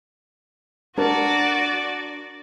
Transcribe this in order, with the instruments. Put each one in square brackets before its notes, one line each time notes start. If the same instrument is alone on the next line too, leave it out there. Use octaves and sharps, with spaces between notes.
[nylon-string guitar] D4 A#4 [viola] F#4 D5